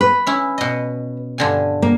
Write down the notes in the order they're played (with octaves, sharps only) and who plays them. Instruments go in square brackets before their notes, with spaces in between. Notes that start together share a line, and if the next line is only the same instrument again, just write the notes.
[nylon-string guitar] B4
[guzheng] C#4 E4
B2 D#5
G2 D3 G#5
[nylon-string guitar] A#3